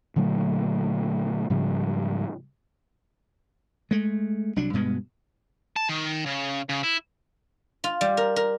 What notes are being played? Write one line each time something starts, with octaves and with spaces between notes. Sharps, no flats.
A#2 D3 F#3 A3
G#2 C#3 F3 G3
G#3 A3
C2 F#3 D4
G2 B2 G#3 B3
A5
D#3
C#3
C#3
E4
F4
G3
A#4
A#4